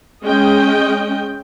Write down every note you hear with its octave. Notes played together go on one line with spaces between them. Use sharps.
G#3 C#4 D#5 G5